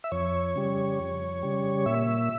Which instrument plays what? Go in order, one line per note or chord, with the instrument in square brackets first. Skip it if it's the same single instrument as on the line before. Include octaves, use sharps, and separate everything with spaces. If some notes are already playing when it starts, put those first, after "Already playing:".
[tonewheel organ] E5
F2 C#5
C#3 G3
F2
C#3 G3
A#2 E5